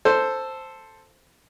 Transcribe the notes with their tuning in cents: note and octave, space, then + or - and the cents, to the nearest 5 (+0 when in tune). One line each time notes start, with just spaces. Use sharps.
A4 +5 C5 +0